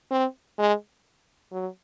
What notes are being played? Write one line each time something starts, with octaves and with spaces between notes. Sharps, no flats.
C4
G#3
F#3